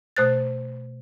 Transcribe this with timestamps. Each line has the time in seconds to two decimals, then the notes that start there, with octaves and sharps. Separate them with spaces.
0.16 B2 A3 C5 F#6 A6